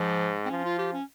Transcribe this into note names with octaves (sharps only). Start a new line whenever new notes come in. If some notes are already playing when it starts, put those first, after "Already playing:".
Already playing: G#2 F3
C4
F3 C#4
F4
G4
C#4